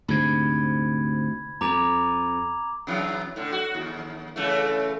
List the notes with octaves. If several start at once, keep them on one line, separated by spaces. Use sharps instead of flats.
D2 G#2 C3 B5 G#6
F2 A#5 D6 F7
C3 E3 F#3
A2 D3
F#4
D#2
C#3 E3 A3